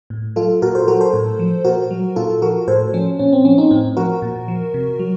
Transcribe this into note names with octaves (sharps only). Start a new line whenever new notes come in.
A2
F#3 F4 A4
A#2 F#4 A#4
A4 C5
F#3 F#4 A#4
A4 C5
A2
F3
A#2 F#4 A#4
F#3
A#2 F4 A4
F3 F#4 A#4
A2 A4 C5
F3 C#4
A#2 C#4
C4
F3 C#4
C4 D#4
A2 C4
F3 F#4 A#4
A#2
F3
C3
F#3